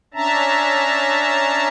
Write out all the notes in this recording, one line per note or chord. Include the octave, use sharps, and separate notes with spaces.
C#4 D4 E5 A5 A#5